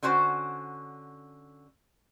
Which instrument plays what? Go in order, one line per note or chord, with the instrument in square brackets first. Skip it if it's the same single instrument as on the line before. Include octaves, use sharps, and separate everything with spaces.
[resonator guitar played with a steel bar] D3 C#4 F#4 C5